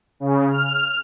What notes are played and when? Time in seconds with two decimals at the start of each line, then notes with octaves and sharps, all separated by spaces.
0.20 C#3
0.51 F6